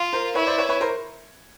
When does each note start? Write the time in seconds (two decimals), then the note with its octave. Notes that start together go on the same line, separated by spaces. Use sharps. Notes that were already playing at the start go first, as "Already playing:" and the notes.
Already playing: F4
0.13 A#4 C5
0.35 E4 B4 C#5
0.47 C5 D5
0.58 B4 C#5
0.69 B4 C#5
0.81 A#4 C5